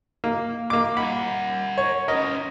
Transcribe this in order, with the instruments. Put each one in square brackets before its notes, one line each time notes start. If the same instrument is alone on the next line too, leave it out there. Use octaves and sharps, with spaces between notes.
[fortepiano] A#3
A#3 D6
[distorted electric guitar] A#4 F#5 [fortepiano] B5
[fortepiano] C#5
[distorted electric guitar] C#4 B4 [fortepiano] A#4 D#5